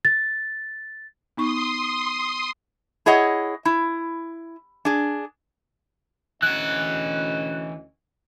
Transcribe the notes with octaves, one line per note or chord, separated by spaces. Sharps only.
A6
B3 D#4 C6 C#6 D#6
E4 G#4 C#5 D#5 F#5
E4
D4 G#4
D2 E3 C#4 F#4 D#5 F#6